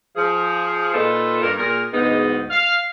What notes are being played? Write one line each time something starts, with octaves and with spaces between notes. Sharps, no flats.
F3 G#4
A#2 D#4 F4 A4 B4
G2 A#4
A#2 G#4 A#4
D2 G#2 G#3 B3 D#4
F5